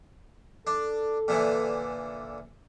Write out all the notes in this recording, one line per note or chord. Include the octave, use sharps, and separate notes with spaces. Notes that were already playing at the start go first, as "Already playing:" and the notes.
D4 A4
A#2 D3 E3